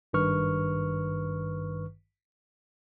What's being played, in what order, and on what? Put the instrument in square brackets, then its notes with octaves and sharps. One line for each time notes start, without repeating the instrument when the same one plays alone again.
[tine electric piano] G#1 G2 D#3 B4 C#6 F6